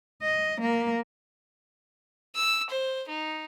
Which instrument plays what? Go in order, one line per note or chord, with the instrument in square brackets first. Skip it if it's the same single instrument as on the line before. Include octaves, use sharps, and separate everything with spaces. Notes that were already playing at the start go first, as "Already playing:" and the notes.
[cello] D#5
A#3
[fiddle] E6
C5
D#4